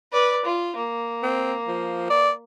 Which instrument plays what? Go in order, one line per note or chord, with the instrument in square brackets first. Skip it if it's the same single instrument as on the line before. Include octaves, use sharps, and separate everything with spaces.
[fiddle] B4 D5
F4
A#3
[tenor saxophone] C4
F3
D5